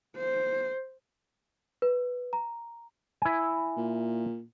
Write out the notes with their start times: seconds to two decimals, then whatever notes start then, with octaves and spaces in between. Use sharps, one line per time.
0.17 C5
1.82 B4
2.33 A#5
3.22 E4 G#5
3.77 A#2